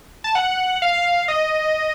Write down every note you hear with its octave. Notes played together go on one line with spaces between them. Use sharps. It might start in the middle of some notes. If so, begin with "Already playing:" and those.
A5
F#5
F5
D#5